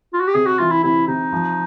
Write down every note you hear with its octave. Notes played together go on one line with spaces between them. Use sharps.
F4
F#4
G4
C3 G#4
F#4
E3 F4
E4
C3 E4
C3 D#4
F3